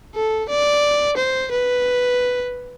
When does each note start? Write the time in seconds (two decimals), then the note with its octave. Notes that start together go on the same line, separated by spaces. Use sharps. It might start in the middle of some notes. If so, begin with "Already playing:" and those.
0.15 A4
0.49 D5
1.17 C5
1.51 B4